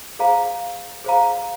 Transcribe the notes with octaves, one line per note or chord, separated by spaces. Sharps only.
G#4 C5 F5 A#5
G#4 C5 F5 A#5